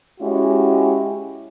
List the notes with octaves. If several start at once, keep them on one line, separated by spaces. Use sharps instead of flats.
G#3 C#4 E4 F#4 G4